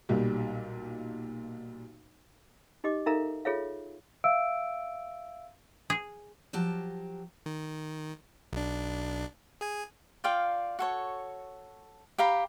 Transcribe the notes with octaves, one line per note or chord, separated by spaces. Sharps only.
B1 A#2 G3
D#4 G4 D#5 D6
D#4 A4 A#4 E5 F5 A#5
F4 G#4 A4 C#5 E5 F5
E5 F5 E6 D7
G#4
F3 F#3 G4 A5
D#3
B1 D4
G#4 G#5
F4 D5 F5 G5
F#4 A4 C#5
G4 F5 A#5 B5